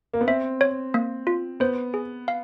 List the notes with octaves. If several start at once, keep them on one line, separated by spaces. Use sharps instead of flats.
A#3
B3
C4 E5
C#5
A#3
F4
B3 C5
G#4
F5